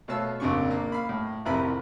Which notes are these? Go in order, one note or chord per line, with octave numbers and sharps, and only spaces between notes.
B2 A3 C#5 F5 A5 E6
A#1 F2 C#3 D4 C#6
A#3
F5 B5
A2
A1 F2 C3 E4 A#4 B5